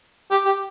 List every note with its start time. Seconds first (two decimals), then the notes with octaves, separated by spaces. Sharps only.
0.31 G4
0.45 G4